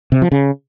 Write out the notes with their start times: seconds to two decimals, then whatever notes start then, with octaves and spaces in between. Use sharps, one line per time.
0.12 C3
0.22 F3
0.32 C#3